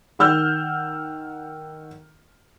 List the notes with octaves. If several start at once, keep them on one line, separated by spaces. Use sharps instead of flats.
D#3 F#5 E6 F6 G6